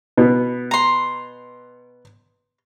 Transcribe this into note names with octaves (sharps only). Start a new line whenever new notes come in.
B2 B3
A#5 C6